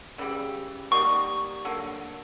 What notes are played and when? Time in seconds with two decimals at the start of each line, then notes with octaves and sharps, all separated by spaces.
0.18 C#3 E3 G3
0.91 G3 A#3 D#4 F#4 C#6
1.65 D3 F#3 A#3